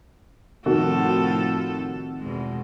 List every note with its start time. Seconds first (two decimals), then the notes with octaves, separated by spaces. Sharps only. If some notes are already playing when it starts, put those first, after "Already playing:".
0.66 A2 C3 D#3 F3 F#4 A4
2.19 E2 B2 G#3